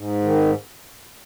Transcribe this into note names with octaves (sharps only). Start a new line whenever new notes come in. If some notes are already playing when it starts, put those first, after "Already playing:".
Already playing: G#2
D#3